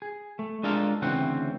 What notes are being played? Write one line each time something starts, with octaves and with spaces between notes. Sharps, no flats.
G#4
A3
G#3 D4 F4 A4 A#4 F5
D2 C#3 E3 C4 F#5